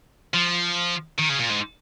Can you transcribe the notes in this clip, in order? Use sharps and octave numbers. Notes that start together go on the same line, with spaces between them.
F3
D#3
C#3
A#2
G#2